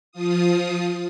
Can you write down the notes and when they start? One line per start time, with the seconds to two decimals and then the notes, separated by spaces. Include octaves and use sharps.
0.12 F3 F4 D#6